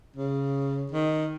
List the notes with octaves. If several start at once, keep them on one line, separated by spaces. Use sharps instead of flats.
C#3
D#3